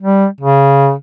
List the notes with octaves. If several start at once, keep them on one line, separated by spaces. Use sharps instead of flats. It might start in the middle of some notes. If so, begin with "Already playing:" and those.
G3
C#3